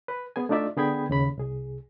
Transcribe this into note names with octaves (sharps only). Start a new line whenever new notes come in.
B4
B3 G#4 G#5
A3 D4 D#4 F4 D5 E5
D3 B3 G#4 G5 B5 G#6
D#2 C#3 B5
C2 G#4